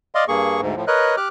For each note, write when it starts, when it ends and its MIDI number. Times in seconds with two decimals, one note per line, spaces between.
0.15 0.24 74
0.15 0.24 75
0.15 0.24 77
0.15 0.24 84
0.28 0.61 43
0.28 0.61 58
0.28 0.61 68
0.28 0.61 85
0.61 0.75 38
0.61 0.75 44
0.76 0.85 45
0.76 0.85 53
0.87 1.16 70
0.87 1.16 71
0.87 1.16 73
0.87 1.16 75
0.87 1.16 90
1.17 1.28 67
1.17 1.28 86
1.17 1.28 89
1.17 1.28 90